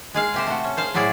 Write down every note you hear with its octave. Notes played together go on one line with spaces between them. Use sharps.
G#3 G#4 F5
C3 G4 C5
A3 F#4
C#4
G#4 C5 F5
A2 F#3 E4 G#4 D5